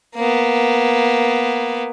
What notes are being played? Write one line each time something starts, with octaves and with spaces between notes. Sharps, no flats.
A#3 B3